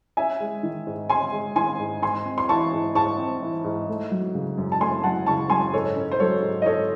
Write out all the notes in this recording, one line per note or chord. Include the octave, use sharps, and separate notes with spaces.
C#4 E5 G#5
G#3
D#3
G#2
C#4 G#5 C6
G#3
D#3 G#5 C6
G#2
G#2 G#5 C6
C4
C6
E3 A5 C#6
G#2
G#2 A5 C#6
C4
E3
G#2
A3
F#3
C#3
F#2
A5
A3 G#5 C6
F#3 F#5 A5
C#3 A5 C#6
F#2 G#5 C6
G#2 A4 C#5
C#4
C5
F#3 A4 C#5
G#2
D#5
G#2 A4 C#5